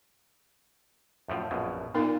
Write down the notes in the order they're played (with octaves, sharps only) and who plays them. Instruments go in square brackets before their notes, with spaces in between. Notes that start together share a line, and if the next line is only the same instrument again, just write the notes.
[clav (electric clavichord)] F#2 A2 F3
A#1 F#2 B2
[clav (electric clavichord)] A#2 F4 [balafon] B3 D#4 A#4